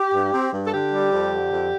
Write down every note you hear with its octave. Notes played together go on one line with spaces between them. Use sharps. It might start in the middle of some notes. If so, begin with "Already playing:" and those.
Already playing: G4
G2
C4
G2
A4
D3 G4
G3
F2
D3
F2